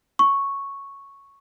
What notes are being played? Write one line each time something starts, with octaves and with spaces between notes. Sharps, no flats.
C#6